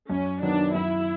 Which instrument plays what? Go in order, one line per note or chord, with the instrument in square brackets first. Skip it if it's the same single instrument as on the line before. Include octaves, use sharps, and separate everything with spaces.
[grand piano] F#2 [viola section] C#4
[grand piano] D#3 F#3 B3 [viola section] D4
[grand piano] F#2 [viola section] E4